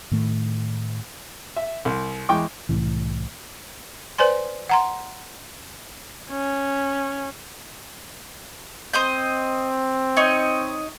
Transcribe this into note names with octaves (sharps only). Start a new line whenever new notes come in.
A2 D#3 A3
E5
C2
E2 E3 G#3 G5 C#6 D6
C2 A2 E3
B4 C5 D5 G#5 C6
F#5 A#5 C6
C#4
C4 C5 D#5 G6
D#4 C#5 D#5